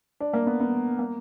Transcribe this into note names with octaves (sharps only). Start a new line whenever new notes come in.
D4
A#3
B3
B3
A#3